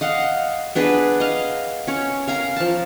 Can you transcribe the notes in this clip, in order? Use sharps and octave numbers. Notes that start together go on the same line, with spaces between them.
D#5 F5 F#5
B3 D4 G#4 B4
D#5 F5
C#4 C#5
A#4 F5 G#5 A#5
F3 A5